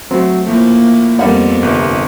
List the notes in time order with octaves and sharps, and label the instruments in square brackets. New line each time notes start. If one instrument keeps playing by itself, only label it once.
[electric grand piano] F#3 A3 [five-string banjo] C4
[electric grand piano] A2 F3 A3 [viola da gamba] A#3
[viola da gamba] F2 B3 [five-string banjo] G3 A#3 F#5
[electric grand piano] G1 C3 B4